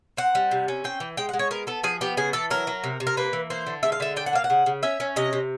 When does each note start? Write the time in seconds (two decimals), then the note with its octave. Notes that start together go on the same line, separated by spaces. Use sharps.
0.17 C4 F#5
0.35 G3
0.51 C3
0.68 C#4
0.84 C4 G5
1.00 E3
1.17 G#3 G5
1.29 F#5
1.33 G#3
1.39 C#5
1.51 B3 A#4
1.67 B3 A4
1.83 F3 G#4
2.01 B3 G4
2.17 C#3 G#4
2.33 E3 A4
2.50 F#3 A#4
2.67 F#3
2.84 C3
3.00 C3
3.07 A#4
3.17 A#3 B4
3.33 E3
3.50 A#3 C5
3.67 D3
3.83 G#3 E5
3.92 F5
4.00 D3 E5
4.16 D4 G5
4.26 F#5
4.33 A#3 F5
4.44 F#5
4.50 C#3
4.66 C#3
4.83 C#4 E5
5.00 C#4
5.16 C3 D#5
5.33 C3